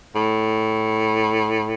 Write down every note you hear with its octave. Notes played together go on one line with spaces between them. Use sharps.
A2